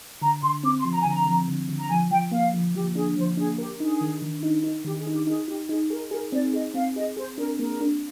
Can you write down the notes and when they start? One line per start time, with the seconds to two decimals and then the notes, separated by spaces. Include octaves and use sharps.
0.21 D3 A#5
0.42 D3 C6
0.63 C4 D6
0.78 C6
0.85 F3
0.92 A#5
1.01 G#5
1.05 D3 A#5
1.26 F3
1.48 D3
1.69 D3
1.79 A#5
1.90 F3 G#5
2.10 F3 G5
2.31 A#3 F5
2.54 F3
2.74 F3 G4
2.95 D4 G#4
3.16 F3 C5
3.37 D4 G#4
3.58 G4 A#4
3.80 D#4 G#4
4.01 D#3
4.22 D#3
4.43 D#4
4.64 D#4
4.85 D#3 G4
4.99 G#4
5.07 D#4
5.13 G4
5.27 D#4 G#4
5.48 D#4 G4
5.69 D#4 G#4
5.90 G#4 A#4
6.11 G#4 A#4
6.32 C4 D5
6.54 G#4 D#5
6.74 C4 F5
6.96 G#4 D#5
7.17 G#4 C5
7.38 D4 A#4
7.58 A#3 A#4
7.81 D4